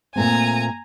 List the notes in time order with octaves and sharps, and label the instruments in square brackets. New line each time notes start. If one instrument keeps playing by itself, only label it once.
[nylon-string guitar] A#2 A3 C4 [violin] G#5 A#5